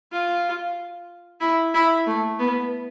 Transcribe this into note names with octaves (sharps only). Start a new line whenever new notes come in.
F4
E4
E4
A3
B3